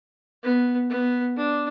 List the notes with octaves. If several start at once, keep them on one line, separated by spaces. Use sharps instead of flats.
B3
B3
D4